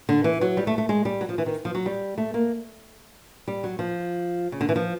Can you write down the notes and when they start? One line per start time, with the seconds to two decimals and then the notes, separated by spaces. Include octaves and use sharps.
0.09 D3
0.24 E3
0.41 F#3
0.57 G3
0.67 A3
0.78 A3
0.89 G#3
1.05 G3
1.21 F#3
1.29 F3
1.38 E3
1.46 D#3
1.65 F3
1.75 F#3
1.86 G3
2.18 A3
2.34 A#3
3.48 G3
3.64 F#3
3.79 F3
4.52 C#3
4.61 D3
4.69 E3
4.76 F3